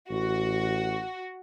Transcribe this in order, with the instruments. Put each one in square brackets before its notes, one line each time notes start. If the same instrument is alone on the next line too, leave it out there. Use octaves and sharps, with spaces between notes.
[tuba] A1 [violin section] F#4